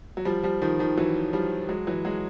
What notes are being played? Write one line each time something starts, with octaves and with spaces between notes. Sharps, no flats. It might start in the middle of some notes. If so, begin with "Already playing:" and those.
F#3
F3 G3
F3 G3
D#3 F3
D#3 F3
E3 F#3
F3 G3
F#3 G#3
E3 F#3
F#3 G#3